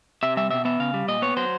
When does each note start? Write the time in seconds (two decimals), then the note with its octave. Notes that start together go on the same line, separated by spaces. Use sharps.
0.23 C3 E5
0.37 G3 E5
0.51 B2 E5
0.65 B3 E5
0.79 C#3 F5
0.94 G3
1.08 A#2 D#5
1.22 B3 C#5
1.37 F#3 C5